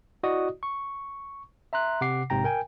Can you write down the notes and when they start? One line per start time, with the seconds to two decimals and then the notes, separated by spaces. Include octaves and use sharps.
0.23 E4 F#4 D5 D#5 D#6
0.63 C#6
1.73 E5 A#5 C6 F#6
2.01 C3 F#5 D6 C7
2.30 A#1 G#2 C3 G5 A#5 A#6
2.44 A#4 G5 G#5